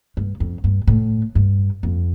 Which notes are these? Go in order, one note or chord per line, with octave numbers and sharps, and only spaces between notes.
G2
F2
G2
A2
G2
F2